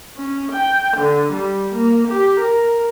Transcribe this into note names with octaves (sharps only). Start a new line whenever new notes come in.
C#4
G5
D3
G3
A#3
G4
A#4